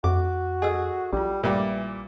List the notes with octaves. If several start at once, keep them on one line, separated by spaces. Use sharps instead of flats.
F2 F#4 D6
G#4 A4 D#5 E6
A#1 G3 F4 G4
A#2 E3 G3